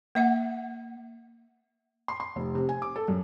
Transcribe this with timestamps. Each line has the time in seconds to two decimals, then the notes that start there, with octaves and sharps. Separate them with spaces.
0.15 A#3 E5 F#5
2.08 C6
2.20 C6
2.36 F1
2.55 C3
2.69 G#5
2.82 D6
2.96 A4
3.08 F#2